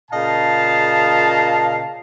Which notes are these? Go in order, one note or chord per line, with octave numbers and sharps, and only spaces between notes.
A#2 C#3 D#5 F5 A5